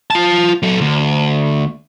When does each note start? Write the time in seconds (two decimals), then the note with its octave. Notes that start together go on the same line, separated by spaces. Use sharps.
0.11 F4 A5
0.63 F#3 A4
0.81 D2